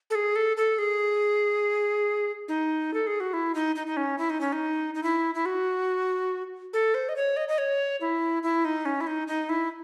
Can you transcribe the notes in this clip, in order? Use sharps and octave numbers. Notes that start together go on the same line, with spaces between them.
A4
G#4
A4
A4
G#4
D#4
A4
G#4
F#4
E4
D#4
D#4
D#4
C#4
E4
D#4
C#4
D#4
D#4
E4
E4
F#4
A4
C5
D#5
C#5
D#5
D#5
C#5
E4
E4
D#4
C#4
E4
D#4
D#4
E4